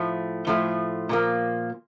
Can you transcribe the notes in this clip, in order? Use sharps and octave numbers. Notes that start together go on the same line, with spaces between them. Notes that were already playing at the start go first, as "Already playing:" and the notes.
Already playing: A2 F3 A3
A2 F3 A3
A#2 F3 A#3